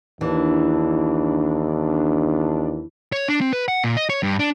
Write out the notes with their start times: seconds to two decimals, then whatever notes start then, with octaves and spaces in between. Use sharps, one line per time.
0.21 D#2 E3 D4
3.12 C#5
3.28 D4
3.41 C4
3.53 B4
3.68 F#5
3.84 A#2
3.97 D#5
4.10 C#5
4.23 G2
4.39 D4